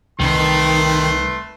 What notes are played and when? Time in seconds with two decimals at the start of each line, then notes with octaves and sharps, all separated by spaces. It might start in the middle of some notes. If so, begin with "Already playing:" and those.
0.20 C2 D#3 A3 B4 C6